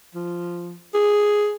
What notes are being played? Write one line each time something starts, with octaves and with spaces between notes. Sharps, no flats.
F3
G#4